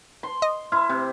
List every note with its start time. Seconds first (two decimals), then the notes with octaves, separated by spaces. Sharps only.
0.23 C6
0.42 D#5
0.72 E4 C6 F6
0.89 C3